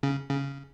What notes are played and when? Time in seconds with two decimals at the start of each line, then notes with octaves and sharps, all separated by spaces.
0.03 C#3
0.30 C#3